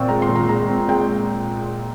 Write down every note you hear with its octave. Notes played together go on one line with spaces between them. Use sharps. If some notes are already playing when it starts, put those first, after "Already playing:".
Already playing: A#2 C4 C#6
G#3 A#5
C6
A#2
A#5
G#3 A#5
C4
G#3 G5